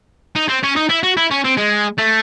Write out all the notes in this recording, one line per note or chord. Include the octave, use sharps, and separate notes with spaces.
D#4
C4
C#4
D#4
E4
F#4
E4
C#4
C4
G#3
A3